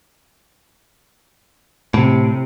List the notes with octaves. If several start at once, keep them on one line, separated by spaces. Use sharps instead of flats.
A2 C3